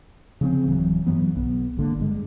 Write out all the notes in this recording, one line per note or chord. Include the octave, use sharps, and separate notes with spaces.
C#3 F3 B3 C4
D1 E3 F#3
G2 E3 F#3 B3
B1 B3
G#1 D3 A#3
G2 G#3